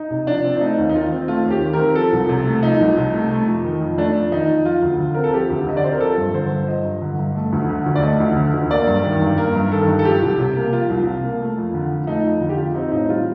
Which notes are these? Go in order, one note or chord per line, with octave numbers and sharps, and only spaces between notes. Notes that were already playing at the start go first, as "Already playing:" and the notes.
Already playing: D#4
C3
F3 D4
C4
D4
A3 D#4
D#2
D#4
D#3 F4
C4
A3 F4
D#2
G4
D#3
A#4
C4
F3 A4
C2
C3
A3
F3 D#4
C2
C3
A3
A3
F2
D#3
F2
A3 D4
F2
D#3 D#4
F2
F3 F4
D2
D3
C4 A#4
A4
F3 G4
D2
D3 D#5
D5
C4 C5
A#4
F3 A4
G2
D3 C5
G2
F3 D#5
G2
D3
G2
A3
D2
D3
D2
D5
A3 D#5
D2
D3
D2
A#3 D5
G2
D#3
G2
A#3 A#4
G2
D#3 A4
G2
A4
F3 G4
C2
C3
A#3
F3 F4
C2
C3
A#3
A3
F2
D3
F2
A3 D#4
F2
D3 F4
G4
F2 F4
C4 D#4
A2 D#4
G3 F4